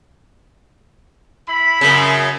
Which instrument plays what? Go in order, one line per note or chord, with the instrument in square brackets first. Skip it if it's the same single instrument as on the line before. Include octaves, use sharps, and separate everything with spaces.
[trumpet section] E4 B5
[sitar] F#2 C#3